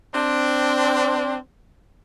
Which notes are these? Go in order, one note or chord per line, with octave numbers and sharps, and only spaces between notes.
C4 D4